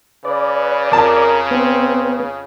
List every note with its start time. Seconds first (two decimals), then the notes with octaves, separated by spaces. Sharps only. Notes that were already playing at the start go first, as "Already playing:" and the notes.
0.25 C#3 B4 D5
0.92 F2 A#4 A5
1.51 B3 C4